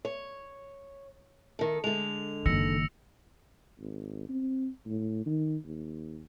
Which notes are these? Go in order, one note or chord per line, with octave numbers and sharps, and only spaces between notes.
C#5
D#3 A4
D3 G#3 F7
F#1 D#3 E6 A#6 C#7
G#1
C4
A2
D#3
D#2